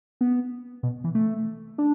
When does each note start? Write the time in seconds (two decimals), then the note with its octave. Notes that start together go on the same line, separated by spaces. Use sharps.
0.21 B3
0.83 B2
1.04 E3
1.15 A3
1.78 D4